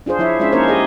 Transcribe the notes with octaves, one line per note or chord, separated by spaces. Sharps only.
D4 F4 G#4 C5
F3 E4 C#5 E5
G#3 C#4 D4 F4 E5
A#3 C#4 D#4 A#4 C5 C#5
G4 G#4 D#5